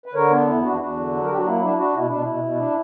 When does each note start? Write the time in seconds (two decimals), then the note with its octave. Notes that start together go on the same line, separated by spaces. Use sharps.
0.06 B4
0.14 D3 A#4 C#5
0.30 B3 D4
0.47 E2 E4
0.63 E2 D4 F#4
0.72 E4
0.79 E2 D4 F#4
0.96 D3
1.13 F#3
1.24 A#4
1.28 F#3 G4
1.38 F#4
1.45 A#3 E4
1.61 D4 E4
1.77 D4 F#4
1.93 B2 E4
2.08 B2 D4
2.22 B2 E4
2.43 B2
2.59 D4